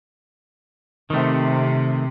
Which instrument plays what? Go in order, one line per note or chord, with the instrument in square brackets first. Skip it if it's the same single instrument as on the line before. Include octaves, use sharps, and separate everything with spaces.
[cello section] C3 [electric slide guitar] D#3 A3